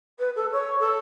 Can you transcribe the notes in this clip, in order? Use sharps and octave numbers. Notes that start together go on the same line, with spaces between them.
B4
A4
C#5
A4